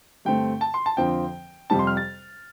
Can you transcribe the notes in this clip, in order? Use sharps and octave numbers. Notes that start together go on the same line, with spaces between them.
G2 D3 A3 C4 G5
A5
C6
A5
F2 D3 F3 C4 G5
F2 C3 G3 C4 A5
C6
F6
A6